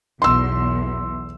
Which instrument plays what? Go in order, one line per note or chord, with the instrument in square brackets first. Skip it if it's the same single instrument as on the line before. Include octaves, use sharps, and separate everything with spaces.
[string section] B1 E2 [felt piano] C6 E6